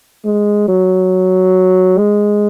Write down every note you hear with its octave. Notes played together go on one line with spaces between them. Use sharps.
G#3
F#3
G#3